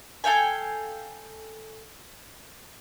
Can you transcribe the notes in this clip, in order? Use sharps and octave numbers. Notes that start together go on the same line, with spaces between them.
A4 F5 G5 G#5